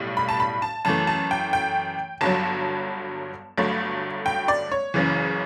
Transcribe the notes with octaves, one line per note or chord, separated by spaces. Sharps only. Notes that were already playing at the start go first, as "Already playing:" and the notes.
Already playing: B1 A2 G3
B5
A5
B5
A5
F#2 E3 A3 A5
A5
G5
G5
G1 G2 F#3 A5
G1 G2 F#3 A3
G5
D5
C#5
F#1 F#2 C#3 E3